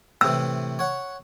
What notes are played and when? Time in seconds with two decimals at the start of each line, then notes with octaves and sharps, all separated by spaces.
0.21 A2 C3 E3 E6
0.79 C#5 F#5